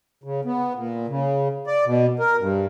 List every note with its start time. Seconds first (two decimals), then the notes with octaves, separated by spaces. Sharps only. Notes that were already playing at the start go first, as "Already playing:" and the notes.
0.24 C#3
0.45 B3
0.74 A#2
1.08 C#3
1.67 D5
1.85 B2
2.19 A#4
2.39 G2